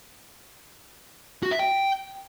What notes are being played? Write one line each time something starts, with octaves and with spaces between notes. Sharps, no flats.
F#4
E5
G5